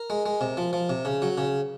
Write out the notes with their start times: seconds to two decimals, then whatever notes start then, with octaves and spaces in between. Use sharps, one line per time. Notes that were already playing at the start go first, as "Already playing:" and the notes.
Already playing: A#4
0.10 G#3
0.26 G#3
0.41 C3
0.57 F3
0.73 F3
0.90 C3
1.05 C#3
1.22 F#3
1.38 C#3